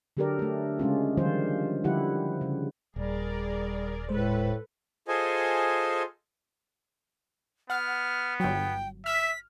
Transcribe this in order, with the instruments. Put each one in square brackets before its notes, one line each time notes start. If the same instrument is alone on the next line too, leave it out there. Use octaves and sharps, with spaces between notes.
[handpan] D3 F#3 G4 A4 A#4 D5
A3 D4
C#3 G#3 C#4 F4
D3 D#3 F3 G3 F4 C5
D3 F3 G3 E4 G4 F#5
C#3
[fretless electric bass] D#1 [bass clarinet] G3 [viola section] G#4 A#4 D5
[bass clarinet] A2 [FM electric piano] G#3 C5 [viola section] A4 B4
[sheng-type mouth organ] F4 G#4 A4 C5 D#5 G#5
[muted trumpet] B3 [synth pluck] F#5 [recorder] F6
[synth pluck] G1 F#3 [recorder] G5
[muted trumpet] E5 [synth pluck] F6 [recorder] B6